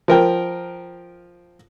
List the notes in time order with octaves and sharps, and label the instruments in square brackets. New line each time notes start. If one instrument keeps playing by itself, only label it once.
[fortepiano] F3 A#4 G5